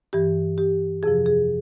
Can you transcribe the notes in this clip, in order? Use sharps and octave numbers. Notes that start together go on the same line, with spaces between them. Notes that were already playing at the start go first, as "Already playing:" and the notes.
G2 E3 G4
G4
F2 C3 F3 G#4
G#4